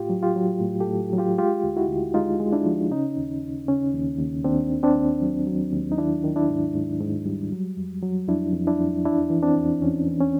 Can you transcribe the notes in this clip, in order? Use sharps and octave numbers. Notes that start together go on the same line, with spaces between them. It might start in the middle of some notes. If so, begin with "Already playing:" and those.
Already playing: A2 F4 G4
F#3
F4 G4
F#3
A2
G4 A4
A2
F#3
F4 G4
G#3 F4 G4
D2
E4 F#4
D2
G#3 D#4 F4
G#3
D4 E4
F3
C#3 C#4 D#4
D#2
D#2
C#3 C#4
D#2
D#2
D#2 C4 D4
D#3
C4 D4
D#2
F#3
F#3
D#2
D#4
D#3 D4 E4
D#3
D4 E4
G#2
G#2
G#2
G3
F#3
F2
F#3
F2 D4 E4
F2
D4 E4
F2
E2 D4 E4
E3
C4 D4
E2
E2 C#4
E3
C#4